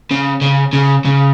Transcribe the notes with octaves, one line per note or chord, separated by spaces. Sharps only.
C#3
C#3
C#3
C#3